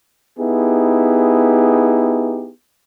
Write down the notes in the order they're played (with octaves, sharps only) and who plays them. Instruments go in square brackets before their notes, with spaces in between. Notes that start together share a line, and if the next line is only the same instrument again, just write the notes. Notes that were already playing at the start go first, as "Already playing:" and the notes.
[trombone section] B3 D#4 E4 G4 G#4